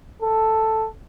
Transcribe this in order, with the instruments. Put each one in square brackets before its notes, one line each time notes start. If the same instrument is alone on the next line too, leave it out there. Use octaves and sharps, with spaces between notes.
[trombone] A4